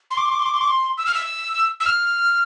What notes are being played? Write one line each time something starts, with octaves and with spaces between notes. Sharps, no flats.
C6
D6
C6
D6
C6
D6
C6
D6
C6
E6
F6
E6
E6
F6